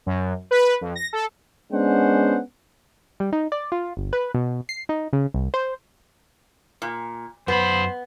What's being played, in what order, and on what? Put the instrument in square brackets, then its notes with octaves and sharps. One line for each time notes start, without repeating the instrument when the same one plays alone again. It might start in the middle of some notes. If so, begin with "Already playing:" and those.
[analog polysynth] F#2
B4
F2
A#6
A4
[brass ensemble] G#3 B3 C#4 D4 C5 F#5
[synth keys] G3
D#4
D5
F4
G1
B4
B2
C7
D#4
C#3
C2
C5
[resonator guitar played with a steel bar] A#2
[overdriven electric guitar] F#2 B5 [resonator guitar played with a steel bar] B3 [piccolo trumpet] C5